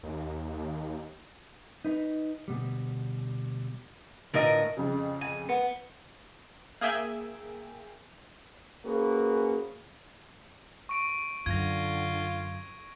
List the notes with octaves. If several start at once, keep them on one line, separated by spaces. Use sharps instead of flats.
D#2
D#4 B4
D2 B2 G3
A2 D3 F4 A#4 B4 D#5
F2 C#3
G#5
B3
A#3 G#4 E5 G5 G#5
A#3 C4 C#4 F#4 G#4 B4
C#6 D7
F#2 D3 F4 G#6 A#6